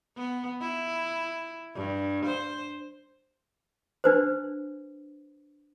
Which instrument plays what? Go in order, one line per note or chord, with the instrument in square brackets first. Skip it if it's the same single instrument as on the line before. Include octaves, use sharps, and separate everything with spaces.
[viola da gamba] B3
E4
G2
C5
[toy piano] D4 B4 C5